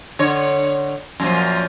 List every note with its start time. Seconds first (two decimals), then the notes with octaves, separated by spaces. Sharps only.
0.19 D3 C#5
1.20 F#2 A#2 F3